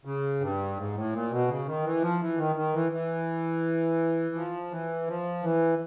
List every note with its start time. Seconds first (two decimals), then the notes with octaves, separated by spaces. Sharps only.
0.05 C#3
0.41 G2
0.77 G#2
0.95 A2
1.12 A#2
1.31 B2
1.48 C#3
1.66 D#3
1.84 E3
2.02 F3
2.20 E3
2.38 D#3
2.56 D#3
2.74 E3
2.92 E3
4.35 F3
4.71 E3
5.08 F3
5.43 E3